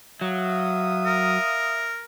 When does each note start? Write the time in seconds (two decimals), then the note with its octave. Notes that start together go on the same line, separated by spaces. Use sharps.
0.21 F#3 E5 F5 D#6
1.06 A#4